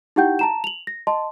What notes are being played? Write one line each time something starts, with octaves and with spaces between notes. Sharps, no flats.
D#4 E4 G4 F#5 G5 G6
A5 A#5 E7
F7 F#7
A#6
D#5 A5 C6